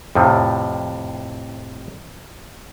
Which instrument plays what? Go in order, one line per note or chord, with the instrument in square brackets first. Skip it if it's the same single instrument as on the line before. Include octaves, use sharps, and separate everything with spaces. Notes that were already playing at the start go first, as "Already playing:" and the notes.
[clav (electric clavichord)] F2 A2 C3 F3